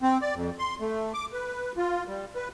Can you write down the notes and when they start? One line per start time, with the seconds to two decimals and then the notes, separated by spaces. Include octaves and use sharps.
0.02 C4
0.21 D5
0.35 F2
0.59 C6
0.81 A3
1.14 D6
1.33 B4
1.77 F4
2.08 G3
2.36 B4